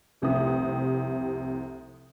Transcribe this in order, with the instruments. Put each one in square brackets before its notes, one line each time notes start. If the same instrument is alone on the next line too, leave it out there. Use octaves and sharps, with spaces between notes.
[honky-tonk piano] F1 C2 C3 A3 G4 D#6